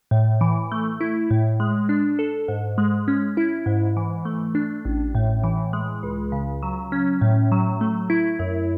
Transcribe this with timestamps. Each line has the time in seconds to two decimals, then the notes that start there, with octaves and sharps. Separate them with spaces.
0.11 A2
0.41 E3
0.72 A3
1.01 E4
1.31 A2
1.60 G#3
1.89 D4
2.19 A4
2.48 G#2
2.78 G#3
3.08 C#4
3.37 E4
3.66 G#2
3.97 E3
4.25 A3
4.55 D4
4.85 A1
5.15 A2
5.44 E3
5.73 G#3
6.03 C#2
6.32 C#3
6.63 F#3
6.92 C#4
7.21 A2
7.52 F#3
7.81 A3
8.10 E4
8.39 F#2